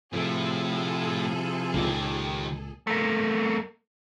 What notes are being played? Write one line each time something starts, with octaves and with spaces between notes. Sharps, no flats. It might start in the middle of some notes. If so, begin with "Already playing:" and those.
A2 C3 F3 E4 G#4 A4
C#2 A#2 D#3 G4
A3 A#3